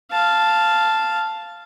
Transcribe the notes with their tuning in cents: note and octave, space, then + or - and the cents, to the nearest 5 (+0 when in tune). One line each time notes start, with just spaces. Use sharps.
F5 -10 A5 +0